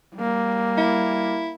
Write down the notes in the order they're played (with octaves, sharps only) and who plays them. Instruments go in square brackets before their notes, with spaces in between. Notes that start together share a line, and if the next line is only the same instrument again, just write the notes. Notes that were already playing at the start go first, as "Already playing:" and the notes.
[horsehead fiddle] G3 A#3
[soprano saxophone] E4